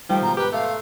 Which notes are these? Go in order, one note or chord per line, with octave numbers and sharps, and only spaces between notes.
D#3 F3 G3 A3 G5
G#2 B2 A#5
G4 B4
A3 F5
C6